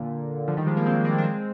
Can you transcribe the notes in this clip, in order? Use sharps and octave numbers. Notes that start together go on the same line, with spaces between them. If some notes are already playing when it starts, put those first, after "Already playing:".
Already playing: A#2 D3
D3 F3
D#3 G3
F3 G#3
G3 A#3
G#3 C4
A#3 D4
D4
G#3 C4